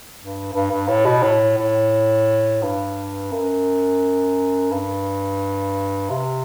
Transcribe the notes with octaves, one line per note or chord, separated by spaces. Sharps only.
G2
G2
G2
A2
B2
A2
A2
G2
F#2
G2
C3